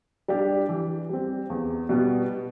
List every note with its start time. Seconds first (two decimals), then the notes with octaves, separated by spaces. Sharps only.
0.28 G3 D4 G4
0.69 E3
1.09 G3 C4
1.50 E2
1.89 B2 G3 B3